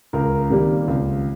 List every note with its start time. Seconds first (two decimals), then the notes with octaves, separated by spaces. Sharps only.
0.13 C#2 A#4
0.50 C3 D#3 G3 A#3
0.87 C#2